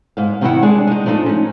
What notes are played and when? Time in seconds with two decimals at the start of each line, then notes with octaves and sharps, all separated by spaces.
0.17 G#2 F5
0.41 C3 D#3 G3 A#3 E4 F#5
0.63 G#3 D4 G#4
0.87 G#3 D#4
1.06 F3 A3 D4 D#4
1.26 C#4 D#4